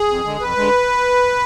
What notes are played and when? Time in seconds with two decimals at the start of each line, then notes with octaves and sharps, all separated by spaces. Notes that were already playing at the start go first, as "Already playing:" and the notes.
Already playing: G#4
0.08 F2
0.24 D3 G#3
0.40 F2 B4
0.57 D3 G#3